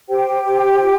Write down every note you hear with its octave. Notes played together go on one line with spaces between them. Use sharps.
G4 C5 G5
C5
F4